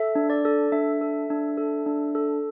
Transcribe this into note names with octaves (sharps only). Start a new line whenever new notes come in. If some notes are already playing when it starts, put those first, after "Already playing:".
Already playing: A4 E5
D4
D5
A4
D4 E5
A4
D4
A4
D4
A4